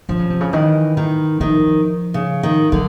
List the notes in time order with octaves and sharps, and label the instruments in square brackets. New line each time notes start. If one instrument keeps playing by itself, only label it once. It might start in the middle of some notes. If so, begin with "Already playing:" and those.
[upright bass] D3 [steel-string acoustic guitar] F3
[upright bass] C#3
C3
C#3
[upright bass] D#3 [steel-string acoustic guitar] E3
[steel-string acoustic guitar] D#3
[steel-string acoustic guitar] D#3 [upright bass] F3
[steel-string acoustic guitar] C#3
D#3
[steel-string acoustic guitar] D3 [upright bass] F#3